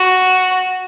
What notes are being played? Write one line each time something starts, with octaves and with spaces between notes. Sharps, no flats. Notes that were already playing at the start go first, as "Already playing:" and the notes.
Already playing: F#4